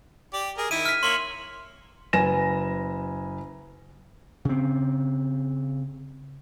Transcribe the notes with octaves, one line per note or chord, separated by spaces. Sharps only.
G4 D5
G#4 A#4
D#3 E4 D#7
F6 B6
A#3 C#5 E5 C6 F#7
F#1 B4 G#5 A#6 E7
C#3 C4